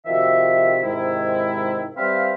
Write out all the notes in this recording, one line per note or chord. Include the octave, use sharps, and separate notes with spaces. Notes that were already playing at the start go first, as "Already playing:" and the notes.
C3 D#3 F3 F#4 E5
G#2 C3 D#3 G#3 E4
G3 C4 B4 C5 E5 F5